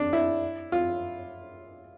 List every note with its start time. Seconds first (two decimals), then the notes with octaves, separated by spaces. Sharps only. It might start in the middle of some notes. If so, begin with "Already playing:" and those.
Already playing: D4
0.13 E4
0.72 F4